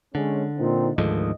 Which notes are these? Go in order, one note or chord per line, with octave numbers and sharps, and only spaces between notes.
D3 G#3 C#4
A#2 C4 D#4
D2 G#2 D#3 F3 A4 D#5